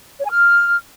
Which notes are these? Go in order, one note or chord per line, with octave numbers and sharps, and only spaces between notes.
C#5
G#5
F6